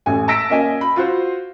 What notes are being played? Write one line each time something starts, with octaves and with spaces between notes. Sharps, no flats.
A1 A3 G#5
A5 E6 A#6 B6 D7
A#3 C#4 D#5 G#5
B5
F4 F#4 C5